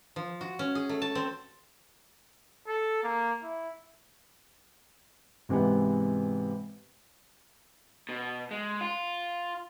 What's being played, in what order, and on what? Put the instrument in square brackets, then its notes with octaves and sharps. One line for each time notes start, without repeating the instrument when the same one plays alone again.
[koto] F3
F#4
C#4
G#4
A3
A5
C4
[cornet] A4
A#3
E4
[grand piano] G#2 C3 E3 G#3 B3
[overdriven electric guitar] B2
G#3
F4